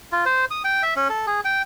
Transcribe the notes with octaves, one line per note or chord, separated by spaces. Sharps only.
F4
C5
D#6
G5
E5
C#4
A4
G#4
G5